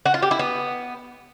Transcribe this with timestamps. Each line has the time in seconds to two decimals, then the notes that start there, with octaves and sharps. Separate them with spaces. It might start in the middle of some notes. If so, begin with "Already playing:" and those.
0.06 F#4
0.14 F4
0.22 G4
0.31 E4
0.39 B3